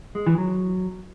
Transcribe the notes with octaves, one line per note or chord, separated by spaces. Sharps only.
G#3
E3
F#3